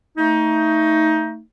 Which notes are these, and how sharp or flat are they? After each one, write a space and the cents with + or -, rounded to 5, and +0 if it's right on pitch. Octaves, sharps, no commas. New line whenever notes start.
A3 +25 D#4 +20